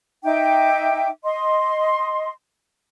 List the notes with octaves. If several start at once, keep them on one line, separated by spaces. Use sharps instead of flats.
D#4 E5 G5 D6
D#5 C6